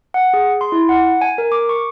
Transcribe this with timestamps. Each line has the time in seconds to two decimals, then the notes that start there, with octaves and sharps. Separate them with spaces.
0.14 F#5
0.34 G#4
0.61 C6
0.72 E4
0.89 F#5
1.21 G#5
1.38 A#4
1.52 D6
1.69 C#6